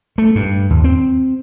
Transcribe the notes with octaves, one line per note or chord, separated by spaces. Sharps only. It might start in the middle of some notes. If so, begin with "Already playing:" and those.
A3
G2
D#2
C4